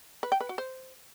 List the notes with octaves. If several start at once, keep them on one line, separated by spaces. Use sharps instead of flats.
B4
G5
B4
F#4
C5